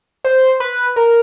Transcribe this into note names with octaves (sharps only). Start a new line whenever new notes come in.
C5
B4
A#4